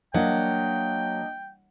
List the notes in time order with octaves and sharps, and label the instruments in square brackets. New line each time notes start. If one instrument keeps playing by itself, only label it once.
[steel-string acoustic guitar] F#3 [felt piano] A#3 [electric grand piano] D4 D#5 F5 [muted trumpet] G5